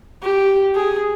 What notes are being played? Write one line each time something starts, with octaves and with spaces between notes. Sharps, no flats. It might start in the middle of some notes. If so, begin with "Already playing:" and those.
G4
G#4